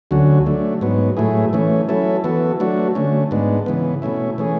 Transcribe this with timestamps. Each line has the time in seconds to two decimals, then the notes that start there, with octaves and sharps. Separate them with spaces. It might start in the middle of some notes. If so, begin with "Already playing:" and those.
0.11 D2 D3 F#3 C#4 F#4
0.46 F#3 A3 D4
0.81 G#2 F#3 B3
1.17 A2 F#3 A3 E4 G#4
1.53 E3 A3 C#4
1.89 F#3 C#4 E4 A4
2.24 E3 B3 F#4 A4
2.60 F#3 A3 D4 F#4
2.95 D3 A3 C#4
3.31 G#2 G#3 B3 D4
3.66 C#3 E3 B3
4.02 B2 A3 C#4 E4
4.38 E3 A3 C#4 G#4